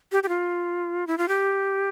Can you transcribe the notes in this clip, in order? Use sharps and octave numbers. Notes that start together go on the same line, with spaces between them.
G4
G4
F4
E4
F4
G4